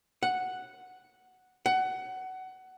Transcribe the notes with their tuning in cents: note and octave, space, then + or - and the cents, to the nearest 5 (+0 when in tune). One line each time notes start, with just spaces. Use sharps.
F#5 +0
F#5 +20